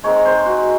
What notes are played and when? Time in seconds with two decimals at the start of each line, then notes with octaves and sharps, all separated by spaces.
0.03 G#3 C4 D#4 C#5
0.25 C5
0.46 F#4